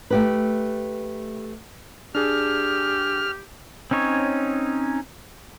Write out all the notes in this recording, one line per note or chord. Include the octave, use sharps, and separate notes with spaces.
A3 G4 B4
D4 G4 G#4 F6
C4 C#4 D#4 C#5